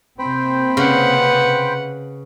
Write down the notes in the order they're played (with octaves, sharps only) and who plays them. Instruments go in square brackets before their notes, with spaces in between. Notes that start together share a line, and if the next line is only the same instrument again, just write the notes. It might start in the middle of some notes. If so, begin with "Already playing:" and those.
[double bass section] C3 A#3 C4 [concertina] C5 G5 B5
[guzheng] C#3 [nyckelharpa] B4 F#5